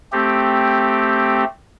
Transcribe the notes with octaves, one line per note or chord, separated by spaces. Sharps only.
A3 C4 G4